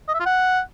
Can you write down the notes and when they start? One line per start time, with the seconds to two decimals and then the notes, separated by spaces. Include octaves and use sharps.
0.08 D#5
0.14 E5
0.20 F4
0.26 F#5